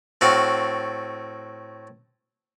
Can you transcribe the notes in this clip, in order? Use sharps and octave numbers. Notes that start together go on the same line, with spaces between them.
A2 C4 F#4 F5